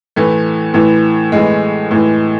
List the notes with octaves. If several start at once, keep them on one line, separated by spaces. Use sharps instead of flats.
A2 E3 A3
A2 E3
A2 E3 G#3
A2 E3